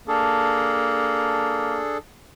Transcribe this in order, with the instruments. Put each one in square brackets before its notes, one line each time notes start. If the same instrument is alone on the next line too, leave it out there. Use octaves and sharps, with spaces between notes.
[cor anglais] A#3 [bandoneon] D4 G#4 A4